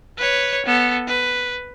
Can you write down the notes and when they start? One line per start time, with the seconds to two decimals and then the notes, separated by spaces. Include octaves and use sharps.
0.18 B4 C#5
0.66 B3 A4
1.08 B4